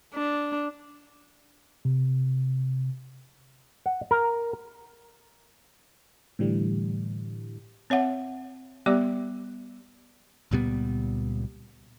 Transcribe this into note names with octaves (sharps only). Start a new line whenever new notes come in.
D4
C3
F#5
A#4
A2 D3 E3 G3
C4 C#5 E5 F#5
G3 B3 G4 D5 D6
C#2 A#2 G3 B3